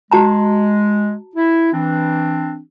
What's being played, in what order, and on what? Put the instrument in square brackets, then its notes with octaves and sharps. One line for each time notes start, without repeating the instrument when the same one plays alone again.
[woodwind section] G#3 [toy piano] F#4 A5 A#5
[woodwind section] E4
E3 C4 D4